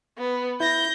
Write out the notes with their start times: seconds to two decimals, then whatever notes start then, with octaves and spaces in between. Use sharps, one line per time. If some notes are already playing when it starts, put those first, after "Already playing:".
0.18 B3
0.60 E4 G6 A#6